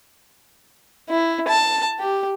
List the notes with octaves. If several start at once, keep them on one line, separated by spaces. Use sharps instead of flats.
E4
A5
G4